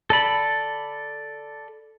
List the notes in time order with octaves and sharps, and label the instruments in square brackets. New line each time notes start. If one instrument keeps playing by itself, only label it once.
[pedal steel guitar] A4 D5 B5